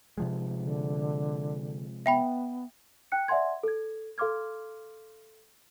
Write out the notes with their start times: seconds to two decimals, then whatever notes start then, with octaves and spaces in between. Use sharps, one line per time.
0.18 C3 F3 G#3
0.64 D3
2.06 B3 E5 G5 B5
3.12 G5 F#6 C#7
3.28 D5 E5 F#5 G#5 C6 G#6
3.63 A4 G#6
4.18 A4 F5 C6 D6 F6 G#6